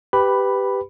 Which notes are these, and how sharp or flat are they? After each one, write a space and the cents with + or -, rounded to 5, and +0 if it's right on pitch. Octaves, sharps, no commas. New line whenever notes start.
G4 +0 B4 +10 B5 +0